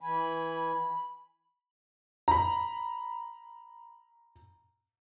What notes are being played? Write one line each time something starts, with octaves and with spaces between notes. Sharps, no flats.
E3 G#5 B5
A#5 B5